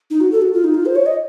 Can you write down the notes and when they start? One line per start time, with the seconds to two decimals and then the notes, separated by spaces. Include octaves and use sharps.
0.10 D#4
0.21 F#4
0.32 A4
0.42 F#4
0.53 F4
0.64 D#4
0.74 F4
0.86 C5
0.96 C#5
1.06 D#5